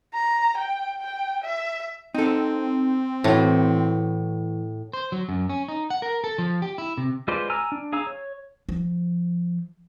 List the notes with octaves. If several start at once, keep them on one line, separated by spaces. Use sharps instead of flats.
A#5
G5
G5
E5
C4 D#4 A4
A2 E3 F#4
C5
F#3
F#2
C#4
D#4
F#5
A#4
A4
F3
G4
E4
C3
G#3 F4 B4 C5 D5
G#5 A#5 E6 F6
D4
G#4 F5 A#5 E6
C#5
F3